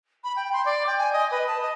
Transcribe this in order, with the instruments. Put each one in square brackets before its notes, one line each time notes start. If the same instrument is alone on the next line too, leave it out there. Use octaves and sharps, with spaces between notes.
[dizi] B5
G5
C6
D5
G5
G#5
D#5
B4
A5
D#5